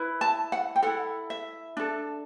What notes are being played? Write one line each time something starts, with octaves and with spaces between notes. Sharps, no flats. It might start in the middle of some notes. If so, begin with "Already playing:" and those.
Already playing: E4 B4
A5
F#5
G5
E4 A4 F#5
E5
D4 A4